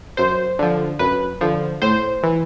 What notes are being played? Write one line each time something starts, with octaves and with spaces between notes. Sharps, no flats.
F#2 C5
D3 F3
F#2 B4
D3 F3
A2 C5
E3